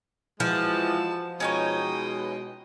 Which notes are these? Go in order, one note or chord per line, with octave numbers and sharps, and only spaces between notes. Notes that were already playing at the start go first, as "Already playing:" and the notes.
E3 F3 G#3 F#4 A5
B2 G#3 C#4 D#4 C#5 D#5 G5